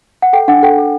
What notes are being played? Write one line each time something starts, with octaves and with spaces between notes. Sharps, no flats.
F#5
A4 G5
D4 F#5
A4 G5
A4